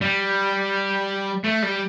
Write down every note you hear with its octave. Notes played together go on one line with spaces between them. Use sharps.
G3
A3
G3